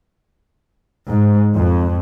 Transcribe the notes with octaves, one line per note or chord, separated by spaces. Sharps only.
G#2
F2